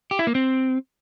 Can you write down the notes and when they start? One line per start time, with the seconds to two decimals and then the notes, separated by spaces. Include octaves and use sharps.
0.11 G4
0.19 E4
0.27 A#3
0.35 C4